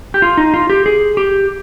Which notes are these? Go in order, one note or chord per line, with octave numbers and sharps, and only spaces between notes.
G4
F4
D#4
F4
G4
G#4
G4